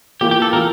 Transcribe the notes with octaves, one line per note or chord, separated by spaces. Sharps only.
E3 A#3 F4 G4
G4
A4
E3 A#3 F4 A#4